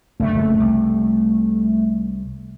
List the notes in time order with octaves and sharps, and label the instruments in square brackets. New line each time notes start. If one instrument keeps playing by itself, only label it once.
[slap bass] F#1 G2 D3 [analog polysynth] A3
[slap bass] F#1 F2
C2